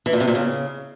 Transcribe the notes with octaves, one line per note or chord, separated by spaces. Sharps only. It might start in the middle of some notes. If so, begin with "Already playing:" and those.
E3
A#2
C3
A#2
C#3